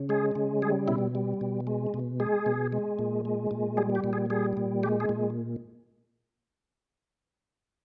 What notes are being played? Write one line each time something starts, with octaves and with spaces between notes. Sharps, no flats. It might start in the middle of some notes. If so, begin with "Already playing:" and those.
Already playing: C#3
G#3 G#4
C#3
G3 G#4
B2 E4
G3
B2
G#3
B2
G#3 G#4
B2
G#3
A#2
G#3
A#2
G3 G#4
G4
A#2
G#4
G3 G#4
A#2
G#3 G4
G#4
A#2